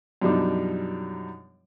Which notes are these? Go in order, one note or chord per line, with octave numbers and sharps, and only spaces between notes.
F#2 B2 F3 G3 D4 D#4